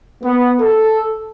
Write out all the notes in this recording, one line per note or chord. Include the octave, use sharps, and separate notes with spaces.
B3
A4